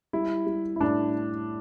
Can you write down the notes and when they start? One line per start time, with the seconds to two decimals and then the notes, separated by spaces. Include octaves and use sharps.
0.13 G3 E4
0.47 G3
0.76 E4
0.80 A2 D4